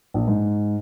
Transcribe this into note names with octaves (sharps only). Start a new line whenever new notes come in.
A#1
G#2